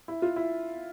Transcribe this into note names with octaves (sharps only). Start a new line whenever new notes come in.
E4
F4
E4